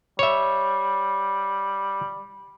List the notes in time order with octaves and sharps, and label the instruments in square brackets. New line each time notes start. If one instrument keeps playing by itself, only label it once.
[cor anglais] G3 [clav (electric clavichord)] C#5 E5